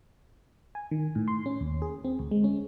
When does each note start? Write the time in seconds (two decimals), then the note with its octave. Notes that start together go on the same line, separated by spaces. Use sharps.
0.75 G#5
0.91 D#3
1.15 A2
1.28 C6
1.46 C#4
1.61 D#2
1.82 G#4
2.05 C4
2.19 D2
2.31 G#3
2.44 C#4